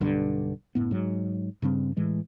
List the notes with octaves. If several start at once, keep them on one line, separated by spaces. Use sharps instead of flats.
B1 G2 D3
F#1 A2 B3
G#2 F#3
G2 C#3 G3 C4
A2 E3 G#3